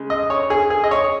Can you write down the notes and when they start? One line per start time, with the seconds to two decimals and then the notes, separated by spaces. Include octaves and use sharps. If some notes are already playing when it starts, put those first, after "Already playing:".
Already playing: C#3 G#3
0.10 D#5
0.30 C#5
0.50 G#4
0.70 G#4
0.84 D#5
0.91 C#5